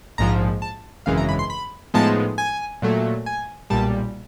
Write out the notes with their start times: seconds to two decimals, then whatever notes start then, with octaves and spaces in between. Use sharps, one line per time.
0.18 A#1 G#2 F3 A#5
0.62 A5
1.06 G#1 F#2 C#3 E3 G#3 F5
1.18 A#5
1.29 B5
1.39 C6
1.50 B5
1.94 A2 F3 G#3 B3 D#4 A5
2.38 G#5
2.82 A#2 F#3 A3
3.26 G#5
3.70 B1 A#2 G3 A5